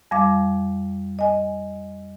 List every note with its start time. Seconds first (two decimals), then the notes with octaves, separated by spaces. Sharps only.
0.11 F2 G3 F5 D6
1.19 D#5 G#5